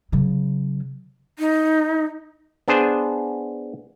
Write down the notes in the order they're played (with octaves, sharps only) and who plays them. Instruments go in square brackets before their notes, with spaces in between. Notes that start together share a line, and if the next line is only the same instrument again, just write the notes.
[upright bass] C#3 F#3
[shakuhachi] D#4
[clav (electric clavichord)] B3 D4 G#4 C5